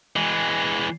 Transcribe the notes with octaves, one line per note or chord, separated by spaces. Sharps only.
E3 G#3